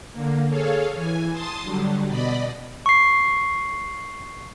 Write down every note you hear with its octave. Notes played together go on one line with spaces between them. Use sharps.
D3 A#3
G#4 A4 C#5 F5
E3 G#5
A5 C6 D#6 A6
D3 F#3 G3
B2 D5 D#5 B5
C#6 C7